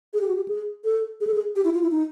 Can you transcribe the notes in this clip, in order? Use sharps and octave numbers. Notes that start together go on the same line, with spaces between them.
G#4
G4
F#4
G4
G#4
A4
G#4
A4
G#4
G4
E4
F4
E4
D#4